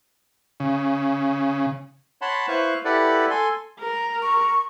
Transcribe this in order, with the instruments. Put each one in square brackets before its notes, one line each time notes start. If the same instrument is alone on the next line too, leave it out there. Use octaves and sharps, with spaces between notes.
[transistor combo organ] C#3
[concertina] C#5 F#5 A5 B5 C6
E4 B4 C5 F5 C#6 F#6
E4 G4 A4 B4 D5 F#5
A4 G#5 C6
[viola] A#4 [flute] A#5
[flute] C#6